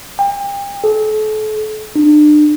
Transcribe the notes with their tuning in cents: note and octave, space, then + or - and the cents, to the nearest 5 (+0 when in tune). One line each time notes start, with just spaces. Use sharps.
G5 +35
A4 -35
D4 +35